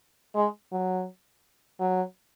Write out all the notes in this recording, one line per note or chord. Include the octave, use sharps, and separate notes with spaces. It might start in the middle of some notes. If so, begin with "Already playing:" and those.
G#3
F#3
F#3